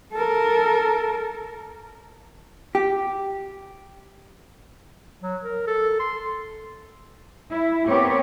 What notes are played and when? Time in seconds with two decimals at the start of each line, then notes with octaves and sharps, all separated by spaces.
0.13 A4 A#4
2.75 G4
5.22 F#3
5.43 A#4
5.67 A4
6.00 C6
7.50 E4
7.88 B3 C4 G4 A#4 C#5